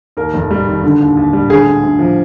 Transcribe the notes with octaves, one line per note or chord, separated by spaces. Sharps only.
D#2 A#4
F1
G3
D#3
D3
D#2
D#2
G3
D3 G#4
D2
D2
F3